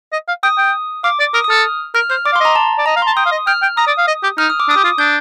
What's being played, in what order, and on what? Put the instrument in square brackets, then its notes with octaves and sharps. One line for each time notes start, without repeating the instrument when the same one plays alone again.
[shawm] D#5
F5
[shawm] G5 [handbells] D#6
[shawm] G5
[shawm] F5 [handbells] D6
[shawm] D5
[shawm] A#4 [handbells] D#6
[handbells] D#6
[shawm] A4 [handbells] F6
[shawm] A#4 [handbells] F6
[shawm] C5 [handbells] F6
[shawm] D5 [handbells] D6
[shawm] F5
[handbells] C6
[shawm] D#5 [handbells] A#5
[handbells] A5
[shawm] D5
[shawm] D#5 [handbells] A#5
[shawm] F5
[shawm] A5 [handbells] C6
[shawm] G5 [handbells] D#6
[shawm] F5
D#5
[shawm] G5 [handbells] F6
[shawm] G5
[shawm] A#5 [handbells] D#6
[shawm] D5
F5
D#5
G4
[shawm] D#4 [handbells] F6
[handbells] D#6
D6
[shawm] D4 [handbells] D#6
[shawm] G4
F4
[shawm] D4 [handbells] G6